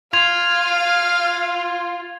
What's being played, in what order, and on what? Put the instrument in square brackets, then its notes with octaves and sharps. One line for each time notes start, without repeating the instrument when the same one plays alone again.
[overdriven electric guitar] F4 [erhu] F5 [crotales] G#6 F7